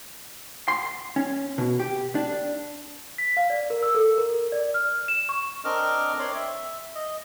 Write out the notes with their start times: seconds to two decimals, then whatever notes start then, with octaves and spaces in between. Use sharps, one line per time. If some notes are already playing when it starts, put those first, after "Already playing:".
0.68 C6
1.16 C#4
1.58 B2
1.80 G4
2.15 D4
3.18 B6
3.37 F5
3.50 D5
3.70 A#4
3.83 E6
3.95 A4
4.18 A#4
4.52 D5
4.74 F6
5.08 E7
5.29 C#6
5.65 C4 D4 A#4 D#5 D6 F6
6.19 C4 C#5 D5 C6 D6
6.34 E5
6.95 D#5